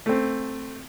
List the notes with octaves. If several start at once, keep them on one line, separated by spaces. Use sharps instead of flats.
A3 C4